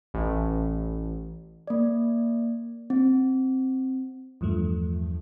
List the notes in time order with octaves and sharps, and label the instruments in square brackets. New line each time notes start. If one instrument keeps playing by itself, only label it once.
[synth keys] A1
[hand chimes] A#3 D5
C4
[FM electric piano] E2 G2 F3 A3